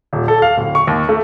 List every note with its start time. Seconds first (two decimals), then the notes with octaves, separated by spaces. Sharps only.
0.13 D#1
0.28 A4
0.42 F5
0.58 D1
0.75 C#6
0.87 D#2
1.09 A3